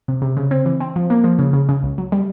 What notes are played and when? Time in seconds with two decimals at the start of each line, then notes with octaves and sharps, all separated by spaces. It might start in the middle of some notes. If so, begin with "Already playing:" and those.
0.08 C3
0.22 C3
0.37 C#3
0.51 C4
0.66 E3
0.80 C4
0.96 F3
1.10 A#3
1.24 F3
1.39 C#3
1.53 C#3
1.69 C#3
1.83 C#2
1.98 F#3
2.12 G3